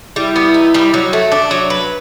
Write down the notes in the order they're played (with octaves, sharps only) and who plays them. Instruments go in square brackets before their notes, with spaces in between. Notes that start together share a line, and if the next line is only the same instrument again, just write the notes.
[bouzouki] G3 [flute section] E4
[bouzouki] B3
D#4
G3
F#3
A3
D4
F#3
B4